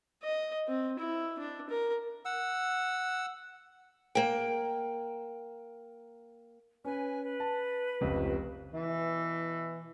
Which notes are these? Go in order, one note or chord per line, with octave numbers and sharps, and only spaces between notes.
D#5
C4
E4
D4
A#4
F#5 E6
A#3 G5
C#4 B4 G#5
B4
A5
F1 C#2 C3
B2 E3